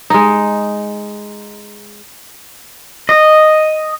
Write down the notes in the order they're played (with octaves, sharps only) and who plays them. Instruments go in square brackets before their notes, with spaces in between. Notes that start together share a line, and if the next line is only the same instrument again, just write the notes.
[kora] G#3 D#4
[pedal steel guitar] D#5